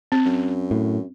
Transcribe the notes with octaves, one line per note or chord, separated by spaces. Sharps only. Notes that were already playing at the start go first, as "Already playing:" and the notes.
C4
F#2
A2